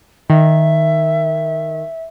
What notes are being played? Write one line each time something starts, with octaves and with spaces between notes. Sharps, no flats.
D#3 E5